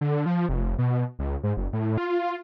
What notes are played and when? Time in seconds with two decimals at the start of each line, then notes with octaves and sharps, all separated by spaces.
0.01 D3
0.26 F3
0.49 F1
0.79 B2
1.19 C#2
1.43 G#2
1.57 F#1
1.73 A2
1.98 F4